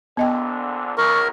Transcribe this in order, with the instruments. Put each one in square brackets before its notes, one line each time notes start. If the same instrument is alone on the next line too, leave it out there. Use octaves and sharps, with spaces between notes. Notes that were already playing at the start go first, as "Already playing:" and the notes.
[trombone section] A#1 D3 [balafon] B3 D#5 G5
[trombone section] C#2 [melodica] A#4 [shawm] C#6